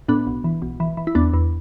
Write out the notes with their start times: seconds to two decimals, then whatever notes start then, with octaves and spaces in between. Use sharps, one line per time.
0.08 A2 B3 D4
0.27 B1
0.44 E3
0.62 B1
0.80 E3
0.97 E3
1.07 E4
1.15 E2 B3 D4
1.33 E2